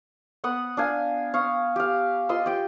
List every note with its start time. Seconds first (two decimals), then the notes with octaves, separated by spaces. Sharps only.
0.44 B3 F#5 D#6
0.77 D4 F5 G#5
1.34 F5 C#6 D#6
1.76 G4 F5
2.29 F4 D#5 C6 E6
2.46 G4 G5